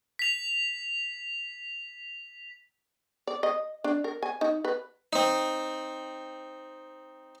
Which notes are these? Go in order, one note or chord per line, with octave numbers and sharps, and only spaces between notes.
B6 F7
D5
D#5
D4
A#4
G#5
D#4
B4
C4 D#4